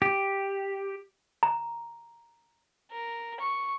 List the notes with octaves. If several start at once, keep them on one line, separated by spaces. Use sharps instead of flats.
G4
A#5
A#4
C#6